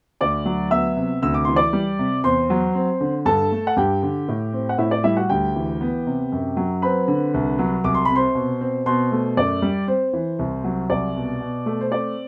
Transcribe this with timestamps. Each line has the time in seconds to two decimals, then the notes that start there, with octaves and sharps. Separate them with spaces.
0.21 D2 D5 D6
0.46 F#3
0.71 B3 E5 E6
0.96 C3
1.22 D2 E6
1.34 D6
1.45 E3 C6
1.56 D5 D6
1.73 G3
1.99 C3
2.24 E2 C5 C6
2.50 F#3
2.75 C4
3.01 D3
3.25 G2 A4 A5
3.52 A3
3.67 F#5
3.76 G2 G4 G5
4.03 D3
4.28 A2
4.53 C4
4.69 F#5
4.78 A2 E4 E5
4.91 D5
5.04 G3 E4 E5
5.17 F#4 F#5
5.30 D2 G4 G5
5.56 E3
5.81 B3
6.07 C3
6.32 F#2
6.57 F#3
6.82 C4 B4 B5
7.08 D3
7.34 C2
7.59 F#3
7.84 C2 D6
7.94 C6
8.05 C3 B5
8.15 C5 C6
8.35 B2
8.61 C4
8.86 B2 C5 C6
9.12 A3
9.37 F#2 D5
9.62 G3
9.88 C4 C5
10.13 E3
10.39 C2
10.64 F#3
10.90 C2 D5
11.15 B2
11.41 B2
11.66 A3
11.81 C5
11.92 C4 D5